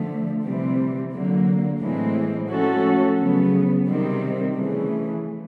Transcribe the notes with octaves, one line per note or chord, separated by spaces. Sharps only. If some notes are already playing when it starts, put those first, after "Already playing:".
Already playing: D3 F3 A3
C3 E3 G3 C4
D3 F#3 A#3
A2 E3 G#3 C4
F3 A3 C#4 F#4 A4
C#3 F#3 B3
C3 D#3 G3 C4
C#3 E3 A3